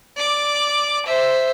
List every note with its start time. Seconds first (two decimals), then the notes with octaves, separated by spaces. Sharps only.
0.17 D5 D6
1.06 C5 E5